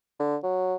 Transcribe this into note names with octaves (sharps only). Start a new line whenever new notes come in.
D3
F#3